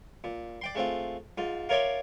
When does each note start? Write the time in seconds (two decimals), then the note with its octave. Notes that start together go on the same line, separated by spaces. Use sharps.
0.24 A#2
0.61 D5 G5 C6
0.75 G#3 A3 C4 F4
1.38 G#2 F4
1.69 F4 A#4 C#5 D5 E5 C6